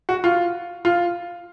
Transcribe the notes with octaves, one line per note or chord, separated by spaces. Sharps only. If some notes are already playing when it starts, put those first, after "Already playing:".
F#4
F4
F4